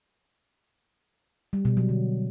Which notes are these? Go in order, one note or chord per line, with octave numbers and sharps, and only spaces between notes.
G3
B2
F#3
D3